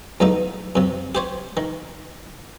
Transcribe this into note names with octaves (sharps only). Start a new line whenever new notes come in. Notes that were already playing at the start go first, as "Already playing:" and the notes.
E2 F#3 A3 D#4
F#2 C3
G4 C5 C#5
D#3